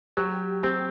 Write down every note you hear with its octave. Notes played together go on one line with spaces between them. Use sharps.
F#3 G4
C4 G4